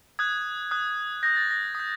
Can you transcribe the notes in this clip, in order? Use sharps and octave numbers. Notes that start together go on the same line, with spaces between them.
D#6 F#6 G#6
D#6 F#6
D#6 G6 A#6
A6
A#6
D#6 G6